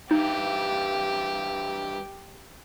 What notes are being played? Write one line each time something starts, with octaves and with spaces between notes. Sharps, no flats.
G2 E3 D#4 G4